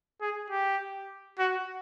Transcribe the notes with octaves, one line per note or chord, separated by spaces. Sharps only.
G#4
G4
F#4